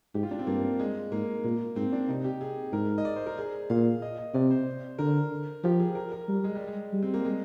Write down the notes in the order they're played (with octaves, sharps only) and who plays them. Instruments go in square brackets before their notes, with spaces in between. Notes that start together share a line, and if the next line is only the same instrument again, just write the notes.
[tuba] G#2 [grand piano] G4
[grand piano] F4
D4
C4
[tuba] G2 [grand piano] A#3
[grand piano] G#3
[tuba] G#2 [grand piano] A#3
[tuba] A#2
[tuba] G#2 [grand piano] C4
[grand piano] D4
[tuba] C3 [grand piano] D#4
[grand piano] G4
G#4
[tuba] G#2 [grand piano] A#4
[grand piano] D#5
D5
C5
A#4
G#4
[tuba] A#2 [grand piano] F5
[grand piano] D#5
D#5
[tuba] C3 [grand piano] D5
[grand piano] C5
[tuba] D3 [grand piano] A#4
[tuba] F3 [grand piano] G4
[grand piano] G#4
A#4
A#4
[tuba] G3
[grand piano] G#3
G3
G#3
[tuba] G3
[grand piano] C4
A#3
G#3